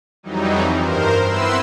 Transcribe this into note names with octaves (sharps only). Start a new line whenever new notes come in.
F2 E3 F#3 G3 D#4
G2 A#4 C5
B3 C4 E4 B4 C6 E6